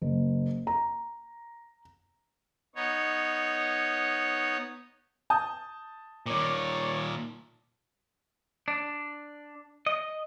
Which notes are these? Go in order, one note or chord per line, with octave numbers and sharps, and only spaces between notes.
F#1
A#5
B3 D#4 C#5
A5 D#6 G6
A#2 D#3 C#5 D5
D4
D#5